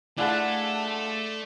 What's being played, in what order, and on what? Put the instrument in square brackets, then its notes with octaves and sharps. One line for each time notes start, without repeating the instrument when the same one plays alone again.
[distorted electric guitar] A3 [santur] D4 E4 C6 [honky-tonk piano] F4 G#4 F#5 [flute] A5